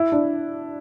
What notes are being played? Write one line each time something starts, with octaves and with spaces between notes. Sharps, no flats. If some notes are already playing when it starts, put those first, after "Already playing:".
Already playing: E4
D4